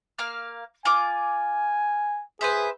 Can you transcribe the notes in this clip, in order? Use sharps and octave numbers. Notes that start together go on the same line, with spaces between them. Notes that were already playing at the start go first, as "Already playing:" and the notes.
A#3 F5 F6
F4 G#5 D6
G#4 B4 C5 E5